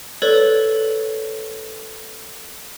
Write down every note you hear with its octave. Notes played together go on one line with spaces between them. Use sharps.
A4 B4 C#5 D5